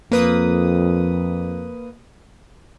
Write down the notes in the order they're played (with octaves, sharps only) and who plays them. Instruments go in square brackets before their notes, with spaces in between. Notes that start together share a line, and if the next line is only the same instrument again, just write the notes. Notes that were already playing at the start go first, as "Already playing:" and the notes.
[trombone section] F2 [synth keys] A#3 B4 D#6